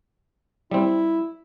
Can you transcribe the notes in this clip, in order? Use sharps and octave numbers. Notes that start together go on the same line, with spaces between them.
G3 C4 E4